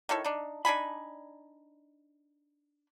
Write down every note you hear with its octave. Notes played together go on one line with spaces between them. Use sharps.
D#3 E4 A4 C#5
D4 D#4
D4 D#4 G#5 B5